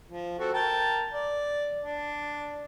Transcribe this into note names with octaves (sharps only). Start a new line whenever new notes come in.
F3
C4 F#4 A4
A#4 G5 A5
D5
D4